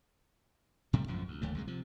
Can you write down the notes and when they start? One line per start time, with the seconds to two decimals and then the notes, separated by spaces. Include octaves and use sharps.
0.93 A2 C3 G3 A3
1.08 A#1 F#2 A2 F3
1.28 D2
1.42 F#1 D#2 D3 A3
1.55 C2 F#2 D3 G#3
1.67 C3 F3